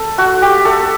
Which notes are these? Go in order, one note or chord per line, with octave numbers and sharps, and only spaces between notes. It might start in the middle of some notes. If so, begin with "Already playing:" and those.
Already playing: A4
A3 F#4
G4
A3 A4